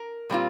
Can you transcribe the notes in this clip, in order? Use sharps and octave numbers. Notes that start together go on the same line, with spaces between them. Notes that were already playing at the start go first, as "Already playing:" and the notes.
Already playing: A#4
A#2 G3 C4 F4